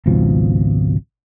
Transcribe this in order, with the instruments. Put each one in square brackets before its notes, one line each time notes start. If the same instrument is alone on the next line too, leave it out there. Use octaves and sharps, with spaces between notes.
[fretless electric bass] G#1 C#2 B2 F3